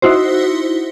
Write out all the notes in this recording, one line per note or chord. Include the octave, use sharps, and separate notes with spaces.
D#4 E4 F#4 C5